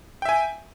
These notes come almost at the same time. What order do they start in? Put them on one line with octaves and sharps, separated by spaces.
G5 E5 G#5